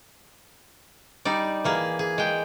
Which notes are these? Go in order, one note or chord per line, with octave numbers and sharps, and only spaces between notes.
G3 D#4 D5
E3 A#3 G#4
G#4
G#3 G5